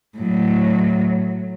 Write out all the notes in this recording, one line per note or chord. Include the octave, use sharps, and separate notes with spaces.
A2 F#3